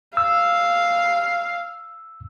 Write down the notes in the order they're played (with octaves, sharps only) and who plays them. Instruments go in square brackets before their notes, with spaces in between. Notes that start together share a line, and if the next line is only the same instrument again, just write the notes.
[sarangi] F5 [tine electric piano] E6